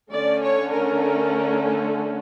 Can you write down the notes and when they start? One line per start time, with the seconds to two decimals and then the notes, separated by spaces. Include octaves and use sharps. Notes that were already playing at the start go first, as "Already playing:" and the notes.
0.10 D3 A3 C#4 D5
0.42 C#5
0.72 A#4